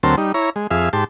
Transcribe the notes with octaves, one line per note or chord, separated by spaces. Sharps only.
D2 F#3 C4 A#4 A5 C6
G3 D#4
E4 C#5 A#5
G#3
F2 G#4 E5 F5
G#2 G4 A5 C6